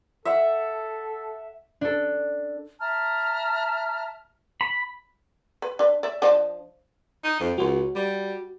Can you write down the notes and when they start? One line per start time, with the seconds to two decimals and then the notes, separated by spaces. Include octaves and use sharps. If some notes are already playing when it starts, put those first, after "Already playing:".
0.25 A4 E5 F#5
1.81 D4 A4
2.80 E5 A5 A#5 F6
4.61 B5
5.62 B4
5.79 D4 B4
6.03 D5 E5
6.22 F3 D4 D#5
7.24 D#4
7.40 F2
7.58 C#2 F#4
7.95 G3